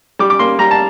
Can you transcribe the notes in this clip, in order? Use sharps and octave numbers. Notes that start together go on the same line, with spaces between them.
G3 D6
D6
A#3 C6
G3 A#5
A5